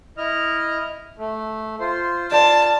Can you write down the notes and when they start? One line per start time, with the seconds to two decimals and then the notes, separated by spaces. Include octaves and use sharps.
0.17 E4 D#5 F6
1.18 A3
1.80 F4 C5
2.32 F4 D5 A5